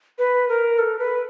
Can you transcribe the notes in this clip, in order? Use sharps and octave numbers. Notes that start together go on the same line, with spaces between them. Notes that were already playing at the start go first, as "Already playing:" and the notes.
B4
A#4
A4
B4